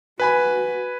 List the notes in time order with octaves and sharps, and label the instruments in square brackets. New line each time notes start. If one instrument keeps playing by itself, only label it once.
[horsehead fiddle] F#4 [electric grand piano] B4 G#5 B5